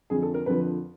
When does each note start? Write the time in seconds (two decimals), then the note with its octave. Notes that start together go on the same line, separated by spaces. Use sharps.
0.10 F2 D3 F3 G#4
0.22 A4
0.34 A#4
0.46 F2 D3 F3 B4